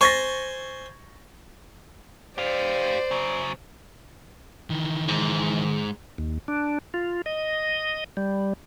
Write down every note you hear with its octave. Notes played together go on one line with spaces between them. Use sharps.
C5 G#5 C#6 A6 A#6
G4 C5 D5 F5
C#3 F#3
D#3 E3
G#2
D#2
D4
F4
D#5
G3